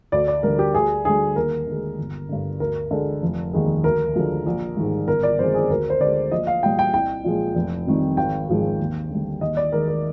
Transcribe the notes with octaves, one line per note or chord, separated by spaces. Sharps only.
D2 D5
D5
D3 G3 A#4
G4
D2 G#4
D3 G3 G#4
D#2 A#4
D3 G#3
G1
G2 D3
D2 A#4
D3 G#3
F1
D#2 D#3 G#3
D2 A#4
D3 F3 G#3
A#1
G#2 D#3 G3
G1 A#4
D5
F2 C3 D#3 G#3 C5
G#4
D2 A#4
C5
D3 G#3 D5
A#1 D#5
F5
A#2 G3 G5
G5
C2 G5
A#2 F3 G#3
F1
F2 C3 D#3 G3
G#1 G5
G#2 F3 G#3
D#2
D3 G3
D#2 D#5
D5
D#3 G#3 A#4
A#4